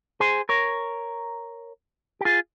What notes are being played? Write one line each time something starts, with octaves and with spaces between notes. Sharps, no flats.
G#4 C5
A#4 C#5
G4
F4 G#4